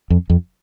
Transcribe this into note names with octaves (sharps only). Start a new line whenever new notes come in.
F2
F2